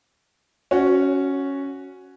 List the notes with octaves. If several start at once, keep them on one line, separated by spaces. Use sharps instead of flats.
C#4 F#4